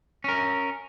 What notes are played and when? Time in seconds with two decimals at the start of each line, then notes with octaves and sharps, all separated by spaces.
0.24 C#4 A#4